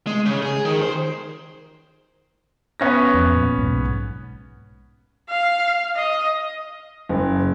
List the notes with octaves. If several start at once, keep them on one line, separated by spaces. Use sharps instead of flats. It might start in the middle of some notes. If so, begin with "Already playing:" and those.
G#3
C#3
G#4
D#3
C5
B3 C#4 A#6
F2
A#2
B1 G#2
F5
D#5
F#1